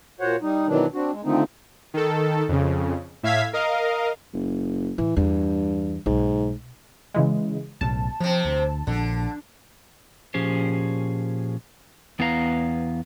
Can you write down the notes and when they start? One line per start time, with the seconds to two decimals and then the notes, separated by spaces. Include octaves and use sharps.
0.21 A#2 F#4 C5 C#5 F#5
0.42 G3 D#4
0.67 B2 D#3 E3 F#3 D4
0.94 C4 D4 F#4
1.12 G#3
1.24 D3 D#3 F3 A3 C4 D#4
1.94 D#3 A4
2.48 F2 C#3
3.23 A2 E5 F5 G#6 B6
3.53 A#4 D#5 F5
4.33 F#1
4.98 A2 E3
5.16 E2 G2
6.06 B1 G#2
7.14 C#3 E3 G#3
7.81 B1 A2 C#3 A5
8.20 C3 F3 C4
8.45 D2
8.87 A#1 D3
10.34 A#2 F3 C#4 G4 G#4 C5
12.19 E2 B3 E4 B4 F5 A#5